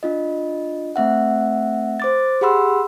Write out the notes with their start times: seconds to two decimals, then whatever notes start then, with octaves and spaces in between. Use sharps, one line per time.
0.03 D4 F4 D#5
0.96 A3 C4 E5 F#5
2.00 C5 D6 A6
2.41 G4 G#4 F#5 B5 C6 E6